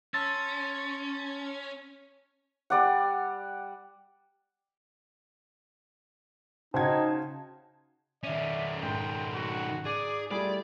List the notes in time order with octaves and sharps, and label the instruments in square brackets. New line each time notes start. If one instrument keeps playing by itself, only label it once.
[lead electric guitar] C#4 [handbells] A5 C6 E6 [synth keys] A6
[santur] G3 D5 F#5
[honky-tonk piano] C#3 F#4 G#6 [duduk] D#4 [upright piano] C5 G5 [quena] A5
[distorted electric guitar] D#3 C#4 [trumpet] D5 [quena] E5
[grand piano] G#2 [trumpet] G5 [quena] C6
[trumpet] F#4
[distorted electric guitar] G#4 [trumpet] D5 [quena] D6
[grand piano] G3 A3 E4 [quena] F4 [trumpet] G#4 [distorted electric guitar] D5